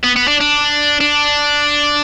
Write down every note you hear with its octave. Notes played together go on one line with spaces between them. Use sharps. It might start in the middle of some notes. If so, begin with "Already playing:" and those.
B3
B3
D4
D4
D4